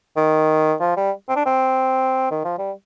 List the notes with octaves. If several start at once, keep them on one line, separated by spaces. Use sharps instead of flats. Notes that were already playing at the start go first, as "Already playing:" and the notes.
D#3
F3
G3
C4
D4
C4
D#3
F3
G3